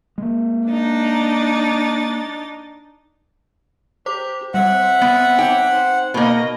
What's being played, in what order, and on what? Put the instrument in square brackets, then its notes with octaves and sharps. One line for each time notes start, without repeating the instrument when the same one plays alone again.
[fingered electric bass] G#3 A#3
[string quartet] D4 D#4 A6
[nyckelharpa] G4 [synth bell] C5 D6
[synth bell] G3 [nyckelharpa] C4 E5 [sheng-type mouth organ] F#5
[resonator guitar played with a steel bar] B3
[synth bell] D#4 [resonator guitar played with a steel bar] G5
[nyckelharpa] C5
[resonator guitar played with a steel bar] B2 A#3 [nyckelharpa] A#4 D#5